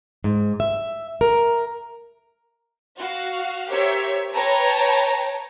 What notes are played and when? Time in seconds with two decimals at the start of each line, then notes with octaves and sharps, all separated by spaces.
0.24 G#2
0.60 E5
1.21 A#4
2.98 F#4 F5
3.69 G4 A#4 C5 C#5 E5
4.33 B4 C#5 G5 A5 A#5